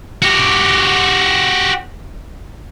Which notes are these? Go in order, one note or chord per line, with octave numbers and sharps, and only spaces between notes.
F#4 G4